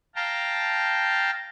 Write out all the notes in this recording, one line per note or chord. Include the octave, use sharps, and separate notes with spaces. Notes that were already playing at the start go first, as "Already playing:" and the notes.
F5 G5 A5 A#5